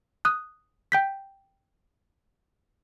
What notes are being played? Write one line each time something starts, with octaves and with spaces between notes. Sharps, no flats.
D#6 F#6
G5 G6 B6